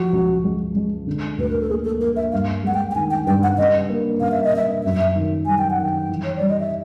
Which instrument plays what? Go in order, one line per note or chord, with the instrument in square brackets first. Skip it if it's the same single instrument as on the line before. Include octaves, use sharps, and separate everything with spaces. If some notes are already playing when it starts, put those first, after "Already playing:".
Already playing: [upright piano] F3 [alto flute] F#4
[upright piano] C#2
G#3
G#3
D3
[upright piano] D2 [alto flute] B4
[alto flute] A#4
A4
[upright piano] A#3 [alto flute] G#4
[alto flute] A4
[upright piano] A#3 [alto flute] A#4
[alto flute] E5
[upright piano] G2 [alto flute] F5
[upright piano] G#3 [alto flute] F#5
[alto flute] G5
G5
[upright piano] D#3 [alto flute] G#5
[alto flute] G5
[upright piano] G2 [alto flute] G5
[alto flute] F#5
[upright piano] C#3 [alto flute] D#5
[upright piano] A#3
[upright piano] C#3 [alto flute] F5
[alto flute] E5
D#5
[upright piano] C#3 [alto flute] E5
[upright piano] F#2 [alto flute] E5
[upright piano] D#3
[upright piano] G3 [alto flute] G#5
[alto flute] G5
F#5
[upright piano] D#3 [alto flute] G5
[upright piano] E3
[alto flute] C#5
[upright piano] G3 [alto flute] D5
[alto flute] D#5
E5